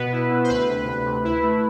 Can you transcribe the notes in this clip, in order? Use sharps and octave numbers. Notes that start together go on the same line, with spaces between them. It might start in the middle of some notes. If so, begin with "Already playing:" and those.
Already playing: B2 B3 B4
E4
B2
C5
D2 B4
C3
D2
C3
E4
A3